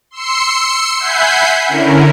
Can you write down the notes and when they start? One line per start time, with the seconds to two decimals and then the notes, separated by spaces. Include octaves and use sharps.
0.11 C6 E6 C7 C#7
0.99 E5 F#5 G#5 B5 G6 C7
1.69 D3 C#4 E4 A#4